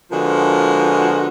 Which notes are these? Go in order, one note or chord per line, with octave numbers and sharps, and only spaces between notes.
D3 F3 G#3 B3 F#4 A#4